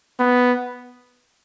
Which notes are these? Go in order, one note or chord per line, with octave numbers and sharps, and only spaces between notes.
B3